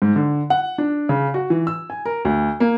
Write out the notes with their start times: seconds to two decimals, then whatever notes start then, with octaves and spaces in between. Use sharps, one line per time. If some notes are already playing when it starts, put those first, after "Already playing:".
0.02 G#2
0.16 D3
0.50 F#5
0.78 D4
1.09 C#3
1.34 F#4
1.50 E3
1.67 E6
1.90 G#5
2.06 A#4
2.25 D2
2.60 A#3